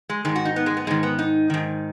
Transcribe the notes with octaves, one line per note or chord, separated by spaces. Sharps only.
G#3
G#2 D#3 G#3
F#4
D#4
B3
G#3
B3
G#2 D#3 G#3
B3
D#4
G#2 D#3